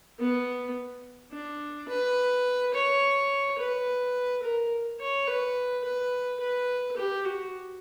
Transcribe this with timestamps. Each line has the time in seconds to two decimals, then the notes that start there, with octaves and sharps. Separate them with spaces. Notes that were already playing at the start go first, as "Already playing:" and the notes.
0.20 B3
1.33 D4
1.89 B4
2.74 C#5
3.59 B4
4.43 A#4
5.00 C#5
5.28 B4
5.84 B4
6.40 B4
6.97 G4
7.25 F#4